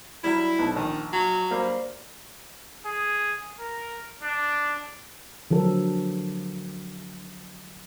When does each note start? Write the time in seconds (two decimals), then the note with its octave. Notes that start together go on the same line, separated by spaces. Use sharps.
0.24 F#3 G3 E4
0.59 B1 A5
0.76 A#1 D#3
1.13 F#3
1.51 G3 A#3 C5
2.85 G#4
3.59 A#4
4.23 D4
5.51 D3 F3 F#3 A4 A#4